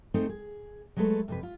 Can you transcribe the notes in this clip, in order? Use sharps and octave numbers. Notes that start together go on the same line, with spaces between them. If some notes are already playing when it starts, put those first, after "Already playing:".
A3 C4 D#4 G#4 A4 C5
G#4
F#3 G#3 A3 A4 B4
F2 C3 B4
F4